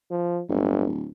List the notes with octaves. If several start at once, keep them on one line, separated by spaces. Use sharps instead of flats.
F3
D1 G1